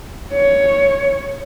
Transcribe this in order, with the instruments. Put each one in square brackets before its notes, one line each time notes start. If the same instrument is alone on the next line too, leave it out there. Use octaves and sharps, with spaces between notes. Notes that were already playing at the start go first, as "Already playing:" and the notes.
[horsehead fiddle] C#5